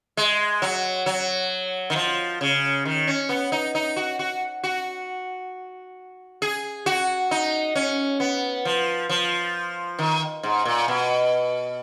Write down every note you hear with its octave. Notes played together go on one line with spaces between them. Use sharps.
G#3
F#3
F#3
D#3
F3
C#3
D#3
C#4
B3
D#4
D#4
F#4
F#4
F#4
G#4
F#4
D#4
C#4
B3
F3
F3
D#3
G#2
A#2
B2